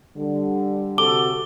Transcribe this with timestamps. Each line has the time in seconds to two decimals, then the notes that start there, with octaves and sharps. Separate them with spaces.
0.17 D3 G3
0.98 C3 F#4 A4 D6 G7